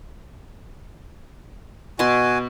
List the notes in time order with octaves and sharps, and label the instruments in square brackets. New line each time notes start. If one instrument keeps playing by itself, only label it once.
[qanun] B2 C6 [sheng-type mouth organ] F#4 G#5